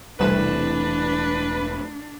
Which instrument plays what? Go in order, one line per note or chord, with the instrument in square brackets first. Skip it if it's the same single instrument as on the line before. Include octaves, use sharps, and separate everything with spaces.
[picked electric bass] E1 E3 A3 [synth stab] C2 E7 [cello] D4 [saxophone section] B4